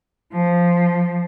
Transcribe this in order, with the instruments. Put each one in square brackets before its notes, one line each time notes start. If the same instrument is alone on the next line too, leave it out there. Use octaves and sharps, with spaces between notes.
[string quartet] F3